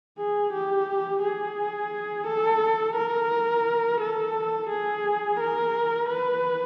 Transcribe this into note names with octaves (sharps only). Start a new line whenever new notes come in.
G#4
G4
G#4
A4
A#4
A4
G#4
A#4
B4